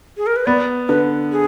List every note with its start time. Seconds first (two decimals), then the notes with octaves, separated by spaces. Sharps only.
0.17 G#4
0.26 A#4
0.36 B4
0.46 B3 D5
0.88 D3 B4
1.32 G#4